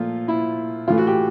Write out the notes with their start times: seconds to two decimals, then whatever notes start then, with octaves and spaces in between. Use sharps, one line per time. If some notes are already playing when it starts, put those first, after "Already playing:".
Already playing: A#2 F3 A3 F4
0.28 E4
0.88 A2 E3 A3 F4
0.98 F#4
1.07 G4